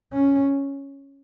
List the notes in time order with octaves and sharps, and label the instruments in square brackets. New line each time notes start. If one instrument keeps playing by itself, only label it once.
[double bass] C#4